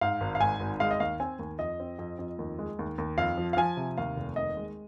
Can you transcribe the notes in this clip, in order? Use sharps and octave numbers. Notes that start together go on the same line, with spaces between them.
G#2 F5
G#1
F5
G#2 G#5
G#1
G#3 F5
D#5
D#2 F5
C4 G#5
D#2
F2 D#5
C4
F2
F2
D#2
G#3
D#2
D#2
F2 F5
F3
F5
F3 G#5
C3
D#2 F5
F1
D#2 D#5
G#3